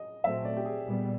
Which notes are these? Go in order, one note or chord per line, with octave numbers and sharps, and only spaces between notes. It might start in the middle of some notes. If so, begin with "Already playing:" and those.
Already playing: D#5
A#2 F#3 A3 C4 E5
D5
G4
G#4
A#2 G3 B3